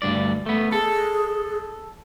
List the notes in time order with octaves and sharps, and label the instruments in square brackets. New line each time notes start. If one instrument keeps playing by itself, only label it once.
[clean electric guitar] D2 G2 D5
A3 B3
[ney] G#4 [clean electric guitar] A4